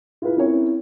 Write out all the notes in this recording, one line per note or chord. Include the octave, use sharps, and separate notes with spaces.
E4 F4 G#4 B4 F5
C4 C#4 E4 A#4 C#5